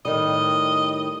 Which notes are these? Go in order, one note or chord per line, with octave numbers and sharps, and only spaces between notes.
A2 D#3 G3 D#5